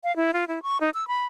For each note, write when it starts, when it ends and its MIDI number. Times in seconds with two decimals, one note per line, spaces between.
0.04 0.14 77
0.16 0.31 64
0.33 0.44 65
0.48 0.62 64
0.63 0.77 85
0.80 0.90 63
0.94 1.07 88
1.08 1.25 83